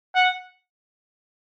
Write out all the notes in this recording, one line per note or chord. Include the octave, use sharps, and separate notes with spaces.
F#5